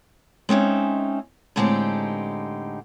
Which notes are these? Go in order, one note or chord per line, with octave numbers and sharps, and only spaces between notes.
G#3 C4 C#4 D#4 E5
A2 D3 G#3 C4 D#4 G4